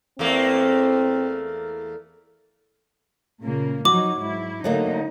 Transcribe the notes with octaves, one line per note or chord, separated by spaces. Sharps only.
E2 A3 A#3 C4
A#2 C#3 A#3
F3 F#3 D#4 F#4 D6
G#2 E4
D3 F#3 A3 A#3 D#4